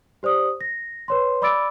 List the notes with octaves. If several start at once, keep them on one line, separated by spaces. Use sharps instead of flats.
G4 C5 D5 D#6
A#6
B4 C#5 C6
D5 B5 D6 E6 A6 D7